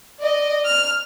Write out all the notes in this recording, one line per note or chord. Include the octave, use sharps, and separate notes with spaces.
D5 D#5
F6